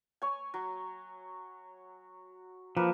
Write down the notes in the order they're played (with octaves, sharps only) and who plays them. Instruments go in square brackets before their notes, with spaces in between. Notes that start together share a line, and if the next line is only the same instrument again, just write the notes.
[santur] C#5 G#5
F#3
[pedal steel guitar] F3 [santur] A#3 B4